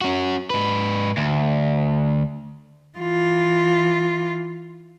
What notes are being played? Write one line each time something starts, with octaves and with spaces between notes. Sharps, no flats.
C#4 F#4
G#2 B4
D2
E3 F4